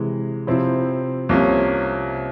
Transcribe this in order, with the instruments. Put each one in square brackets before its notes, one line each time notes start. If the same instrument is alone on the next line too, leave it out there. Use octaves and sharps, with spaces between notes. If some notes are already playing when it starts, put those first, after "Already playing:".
Already playing: [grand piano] C3 E3 G#3
C3 F3 C4 E4
C2 C3 F3 A#3 C#4